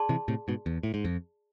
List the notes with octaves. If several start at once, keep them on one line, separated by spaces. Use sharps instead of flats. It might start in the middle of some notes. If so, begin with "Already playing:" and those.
Already playing: G#4 D5 A5 C6
C3 E3
A2 C3
G#2 B2
E2
A2
G#2
F2